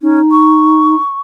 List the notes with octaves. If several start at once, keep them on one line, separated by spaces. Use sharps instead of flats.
C#4 D#4
C#6